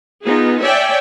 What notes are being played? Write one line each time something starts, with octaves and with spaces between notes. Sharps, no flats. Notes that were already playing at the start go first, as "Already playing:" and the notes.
B3 D#4 F4 G#4
C#5 D5 E5 G5 G#5